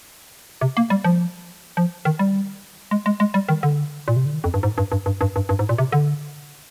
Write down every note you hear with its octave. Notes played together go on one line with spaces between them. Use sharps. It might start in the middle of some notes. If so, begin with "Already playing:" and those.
C3
A#3
G3
F3
F3
D#3
G3
G#3
G#3
G#3
G3
D#3
D3
A#2
C3
D3
D#3
F2
G2
G#2
G2
G2
G2
G2
G2
G2
G#2
A#2
C3
D3